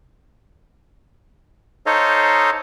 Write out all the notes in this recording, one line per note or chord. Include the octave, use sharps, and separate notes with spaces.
D#4 A4 C5 C#5 D#5 F5